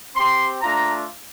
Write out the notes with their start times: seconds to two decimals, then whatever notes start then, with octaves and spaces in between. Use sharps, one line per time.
0.16 C4 G4 C6
0.62 A3 D4 F4 A#5